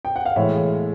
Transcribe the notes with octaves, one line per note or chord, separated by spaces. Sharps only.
G5
F#5
F5
A2 E3 G#3 E5